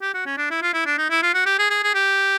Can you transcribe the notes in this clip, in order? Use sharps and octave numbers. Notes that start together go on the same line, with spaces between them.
G4
F#4
C#4
D4
E4
F4
E4
D4
D#4
E4
F4
F#4
G4
G#4
G#4
G#4
G4